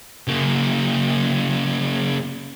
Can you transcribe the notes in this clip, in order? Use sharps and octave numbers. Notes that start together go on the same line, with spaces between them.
C#3 A#3